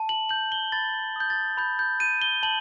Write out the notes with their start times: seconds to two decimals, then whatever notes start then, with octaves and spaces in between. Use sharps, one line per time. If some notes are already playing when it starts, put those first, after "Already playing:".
Already playing: A5
0.09 F#7
0.29 G6 F#7
0.52 G7
0.72 B5 A6
1.16 D#6 G6
1.30 A6
1.57 B5 G6
1.79 G6
2.00 G6 D#7
2.22 G7
2.43 A5 F#7